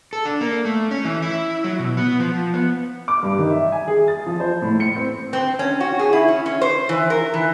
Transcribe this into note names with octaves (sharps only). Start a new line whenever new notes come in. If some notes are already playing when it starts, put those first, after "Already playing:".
A4
D4
A#3
A3
C#4
E3
E4
F#3
B2
B3
F3
B3
D6
G2
D#3
E5
G#5
G#4
A6
F3
C5
A2
C#7
C4
C4
C#4
F#4
G#4
E4
C#4
C#4
C5
E3
A#4
E3